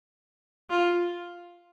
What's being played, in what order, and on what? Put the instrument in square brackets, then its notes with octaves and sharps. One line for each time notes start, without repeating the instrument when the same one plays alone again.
[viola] F4